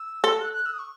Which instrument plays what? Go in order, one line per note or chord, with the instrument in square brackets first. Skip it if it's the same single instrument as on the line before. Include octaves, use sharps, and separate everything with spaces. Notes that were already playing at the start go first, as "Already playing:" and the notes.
Already playing: [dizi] E6
[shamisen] A4
[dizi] E6
F#6
F#6
E6
D#6
C#6